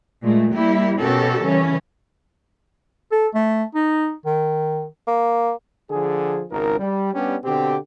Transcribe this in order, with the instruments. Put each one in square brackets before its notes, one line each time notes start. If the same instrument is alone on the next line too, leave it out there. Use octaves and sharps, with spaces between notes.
[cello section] A#2 G#3 A3
G3 A#3 E4 G4
B2 C#4 F#4 G4 A4 A#4
C#3 E3 G3 C#4
[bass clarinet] A4
A3
D#4
D#3
[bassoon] A#3
[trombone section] D3 F3 G#4
G#1 C#2 D#4 A#4
G3
G3 B3 C#4 D4 G4
B2 D3 C4 G4